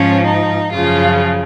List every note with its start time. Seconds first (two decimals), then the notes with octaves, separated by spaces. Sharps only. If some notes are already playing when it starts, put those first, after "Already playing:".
Already playing: G#2 F3 C#4
0.25 D#4
0.72 F#2 C#3 F3 F4